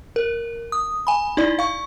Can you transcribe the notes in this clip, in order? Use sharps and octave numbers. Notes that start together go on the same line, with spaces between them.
A#4
D#6
G#5 B5
D#4 E4 D5
F5 C#6